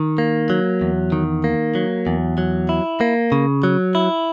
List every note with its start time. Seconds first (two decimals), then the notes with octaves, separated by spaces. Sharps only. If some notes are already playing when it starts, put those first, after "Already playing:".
Already playing: D#3
0.18 A#3
0.50 F#3
0.81 E2
1.12 D#3
1.44 A#3
1.75 F#3
2.07 E2
2.38 F#3
2.69 E4
3.01 A#3
3.32 C#3
3.63 F#3
3.95 E4